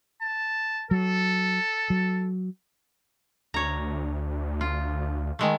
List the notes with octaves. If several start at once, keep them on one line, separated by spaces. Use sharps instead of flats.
A5
F#3 A4
F#3
D2 C#5 A#5
F4
D#3 G#3 A3